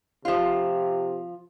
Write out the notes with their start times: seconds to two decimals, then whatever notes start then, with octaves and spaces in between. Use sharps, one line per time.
0.25 C3 F3 F4